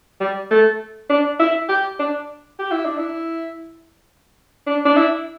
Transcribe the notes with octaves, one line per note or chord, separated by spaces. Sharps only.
G3
A3
D4
E4
G4
D4
G4
E4
D4
E4
D4
D4
E4